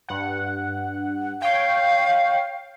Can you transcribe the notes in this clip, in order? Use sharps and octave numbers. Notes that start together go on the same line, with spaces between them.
G2 F#5
C#5 F5 G5